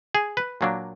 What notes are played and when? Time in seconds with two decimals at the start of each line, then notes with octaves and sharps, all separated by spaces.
0.15 G#4
0.37 B4
0.61 A#2 F#3 A#3 D4